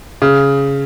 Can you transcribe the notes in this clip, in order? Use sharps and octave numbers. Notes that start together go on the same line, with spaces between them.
C#3